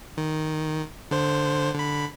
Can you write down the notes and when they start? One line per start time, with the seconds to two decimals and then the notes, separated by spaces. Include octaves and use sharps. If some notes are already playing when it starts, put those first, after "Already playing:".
0.17 D#3
1.11 D3 C5
1.75 D3 B5